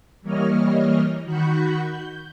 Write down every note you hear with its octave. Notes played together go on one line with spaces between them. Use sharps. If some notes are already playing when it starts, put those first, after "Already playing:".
E3 G3 A#3 C#5 D#5 F6
D#3 F#4 F#5 B5 C#6 G6
G6